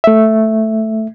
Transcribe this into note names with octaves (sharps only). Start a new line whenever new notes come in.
A3 E5